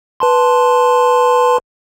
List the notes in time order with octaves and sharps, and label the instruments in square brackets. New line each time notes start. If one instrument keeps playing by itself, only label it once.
[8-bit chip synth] B4 A5 C6